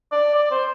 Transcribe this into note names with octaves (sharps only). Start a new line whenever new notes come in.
D5
D5
C5